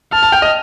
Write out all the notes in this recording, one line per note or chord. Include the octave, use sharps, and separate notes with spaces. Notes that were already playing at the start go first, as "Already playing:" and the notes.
A5 F6
A5
G5
D#5